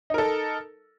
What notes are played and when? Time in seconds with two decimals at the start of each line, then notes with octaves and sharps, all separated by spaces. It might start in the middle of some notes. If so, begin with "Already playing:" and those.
0.10 D#4
0.14 A#4
0.18 A4